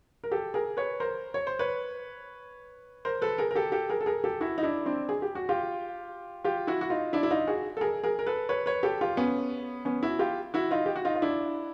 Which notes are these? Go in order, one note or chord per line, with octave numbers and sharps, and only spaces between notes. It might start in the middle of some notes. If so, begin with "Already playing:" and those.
A#4
G4 A4
G#4 A#4
B4 C#5
A#4 C5
C#5
C5
B4 C#5
A#4 C5
A4 B4
G#4 A#4
A#4
G4 A4
G4 A4
G#4 A#4
A4
G#4 A#4
G4 A4
E4 F#4
D#4
D4 E4
C4 D4
G#4
G4
F#4
F4 G4
F4 G4
E4 F#4
F#4
D#4 F4
D4 E4
E4
D#4 F4
F#4 G#4
A4
G#4 A#4
G#4 A#4
A#4
A4 B4
B4 C#5
B4 C#5
G4 A4
F4 G4
B3 C#4
B3 C#4
E4 F#4
F4 G4
E4 F#4
D#4 F4
G4
F#4
D#4 F4
F4
D4 E4